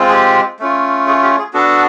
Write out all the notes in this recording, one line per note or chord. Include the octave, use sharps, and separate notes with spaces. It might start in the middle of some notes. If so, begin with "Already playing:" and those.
Already playing: G#3 C4 F4
G#4
G4
A3 C#4 F4
G#4
G4
G#4
B3 D4 F#4 A4